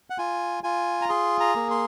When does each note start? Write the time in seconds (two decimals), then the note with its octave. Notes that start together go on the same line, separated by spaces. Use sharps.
0.10 F#5
0.18 F4 G#5
0.63 F4 G#5
1.02 A#5
1.09 G#4 C6
1.40 A#5
1.55 A#3
1.71 C6